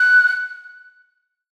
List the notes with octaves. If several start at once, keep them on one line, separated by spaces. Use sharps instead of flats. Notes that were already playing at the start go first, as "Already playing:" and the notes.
Already playing: F#6